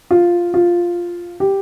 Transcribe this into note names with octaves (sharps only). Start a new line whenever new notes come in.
F4
F4
G4